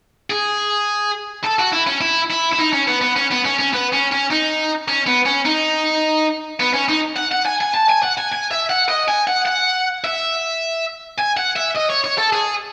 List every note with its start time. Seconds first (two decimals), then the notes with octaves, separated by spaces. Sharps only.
0.30 G#4
1.44 A4
1.59 F#4
1.72 E4
1.87 C#4
2.01 E4
2.31 E4
2.53 E4
2.59 D#4
2.73 C#4
2.88 B3
3.01 B3
3.16 C#4
3.31 B3
3.45 C#4
3.58 C#4
3.73 B3
3.93 C#4
4.12 C#4
4.30 D#4
4.88 C#4
5.06 B3
5.26 C#4
5.45 D#4
6.60 B3
6.74 C#4
6.89 D#4
7.17 F#5
7.32 F#5
7.46 G#5
7.61 G#5
7.74 A5
7.89 G#5
8.02 F#5
8.17 G#5
8.32 G#5
8.51 E5
8.70 F#5
8.89 D#5
9.08 G#5
9.28 F#5
9.46 F#5
10.04 E5
11.18 G#5
11.37 F#5
11.56 E5
11.76 D#5
11.90 C#5
12.04 C#5
12.18 A4
12.33 G#4